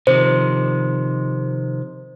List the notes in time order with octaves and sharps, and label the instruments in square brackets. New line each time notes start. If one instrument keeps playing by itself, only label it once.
[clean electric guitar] C3 D#3 F3 [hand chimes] C5